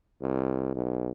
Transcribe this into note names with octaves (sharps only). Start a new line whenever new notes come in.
C2
B1